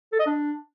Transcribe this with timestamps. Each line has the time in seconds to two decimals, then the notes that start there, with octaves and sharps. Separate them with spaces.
0.13 A4
0.20 D#5
0.26 D4